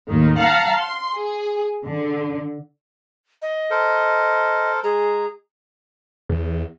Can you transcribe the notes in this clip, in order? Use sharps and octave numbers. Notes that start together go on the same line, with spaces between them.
D#2 A2 D#3
F5 F#5 A5 A#5
C6
G#4
D3
D#5
A4 A#4 C5
G#3 G#4 A#5
E2